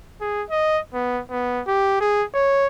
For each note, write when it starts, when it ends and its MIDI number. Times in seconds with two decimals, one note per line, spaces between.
0.21 0.43 68
0.51 0.79 75
0.94 1.20 59
1.31 1.61 59
1.67 1.99 67
2.01 2.23 68
2.34 2.66 73